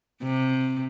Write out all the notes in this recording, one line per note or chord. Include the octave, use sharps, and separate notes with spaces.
C3